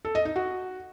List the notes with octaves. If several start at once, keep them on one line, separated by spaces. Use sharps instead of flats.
A4
D#5
D#4
F#4